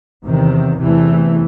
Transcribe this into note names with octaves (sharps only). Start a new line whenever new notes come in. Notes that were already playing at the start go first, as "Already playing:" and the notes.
E2 C3 D#3
E2 C3 E3 A3